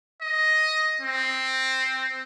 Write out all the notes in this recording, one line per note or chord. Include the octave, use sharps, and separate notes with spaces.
D#5
C4